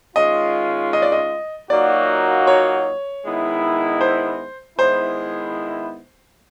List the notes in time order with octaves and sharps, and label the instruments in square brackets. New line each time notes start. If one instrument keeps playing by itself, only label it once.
[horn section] D#3 G#3 C#4 F4 [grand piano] D#5
[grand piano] D#5
D5
D#5
[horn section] A#2 F#3 A#3 D#4 F#4 [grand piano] D5
[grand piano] C#5
[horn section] D#3 G#3 B3 E4
[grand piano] C5
[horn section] D#3 G#3 B3 E4 [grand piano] C5